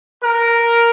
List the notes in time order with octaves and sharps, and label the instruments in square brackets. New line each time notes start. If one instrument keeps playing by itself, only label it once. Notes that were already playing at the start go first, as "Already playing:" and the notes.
[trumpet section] A#4